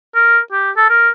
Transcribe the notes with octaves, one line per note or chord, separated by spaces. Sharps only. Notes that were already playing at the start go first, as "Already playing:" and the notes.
A#4
G4
A4
A#4